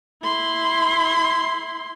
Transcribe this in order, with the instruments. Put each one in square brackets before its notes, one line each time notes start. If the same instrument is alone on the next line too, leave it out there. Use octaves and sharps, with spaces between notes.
[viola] E4 C6